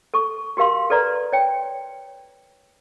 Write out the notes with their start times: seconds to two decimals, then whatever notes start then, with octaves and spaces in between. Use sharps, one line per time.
0.14 A4 C#6
0.57 F#4 G4 A#4 F5 C6
0.90 A4 B4 D5 A#5
1.33 C#5 G5